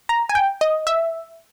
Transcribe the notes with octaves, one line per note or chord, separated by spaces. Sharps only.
A#5
G#5
G5
D#5
E5